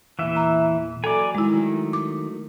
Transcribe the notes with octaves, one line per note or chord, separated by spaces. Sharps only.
E2 A#2 E3 E5
A#5
F#3 A4 B4 D5 G#5 A#5
D#3 G#3 E4
F#3 A3
D6